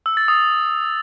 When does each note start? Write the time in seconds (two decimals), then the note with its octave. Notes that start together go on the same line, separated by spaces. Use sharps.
0.06 E6
0.17 A6
0.28 D#6